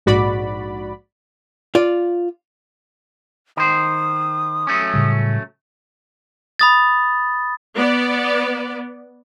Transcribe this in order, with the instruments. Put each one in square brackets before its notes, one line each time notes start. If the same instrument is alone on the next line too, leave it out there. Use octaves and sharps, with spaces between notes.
[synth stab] A#1 G#2 F#4 D5 B5
[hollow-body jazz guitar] F4 D5
[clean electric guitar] D#3 C5 [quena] D#6
[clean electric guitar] F#3 A3 C#4
[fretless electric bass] A2 C#3 G3
[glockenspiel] B5 D#6 A6
[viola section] B3 D5